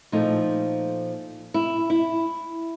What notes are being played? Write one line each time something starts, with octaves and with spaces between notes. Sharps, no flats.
A#2 F3 A3 D#4
E4
E4